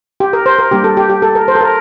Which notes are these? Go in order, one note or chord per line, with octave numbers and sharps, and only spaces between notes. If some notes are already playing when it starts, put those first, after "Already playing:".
G4
A#4
C5
A#4
G3 A#3 D4 G4
A4
G4
G4
A4
A#4
C5
A4
A#4